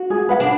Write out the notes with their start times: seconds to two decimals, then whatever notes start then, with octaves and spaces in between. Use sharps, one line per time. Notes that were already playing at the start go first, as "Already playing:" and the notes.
Already playing: F#4
0.10 G#4
0.29 B4 F#5
0.40 D4